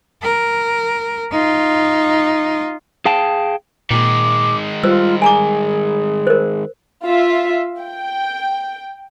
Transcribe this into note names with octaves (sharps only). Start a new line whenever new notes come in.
A#4
D#4 F4
G#4 F5 G5 A5
A#2 D#3 G#3 D6
G3 F4 C5 E6
G#4 G#5 A#5 D6
A#4 C5
F4 E5
G5